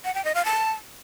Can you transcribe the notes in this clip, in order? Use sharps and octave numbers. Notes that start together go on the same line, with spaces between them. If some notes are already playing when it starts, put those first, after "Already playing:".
F#5
G5
D#5
F5
A5